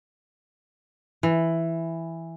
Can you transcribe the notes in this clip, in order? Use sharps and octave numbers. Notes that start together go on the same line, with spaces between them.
E3